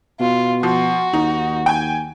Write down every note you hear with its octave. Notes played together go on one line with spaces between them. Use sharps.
B2 F4
F3 F#4
D#2 D#4
G5 G#5